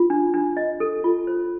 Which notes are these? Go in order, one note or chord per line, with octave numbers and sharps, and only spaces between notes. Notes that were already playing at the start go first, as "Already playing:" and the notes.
Already playing: F4
D4
D4
D#5
A4
F4
C5